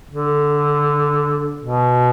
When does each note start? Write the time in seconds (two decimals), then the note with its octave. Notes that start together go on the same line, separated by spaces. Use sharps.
0.10 D3
1.62 B2